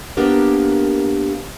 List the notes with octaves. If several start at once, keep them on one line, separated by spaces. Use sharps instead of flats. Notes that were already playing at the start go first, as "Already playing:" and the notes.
A#3 B3 D4 G4 A#4